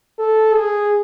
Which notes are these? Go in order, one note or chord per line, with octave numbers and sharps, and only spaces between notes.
A4
G#4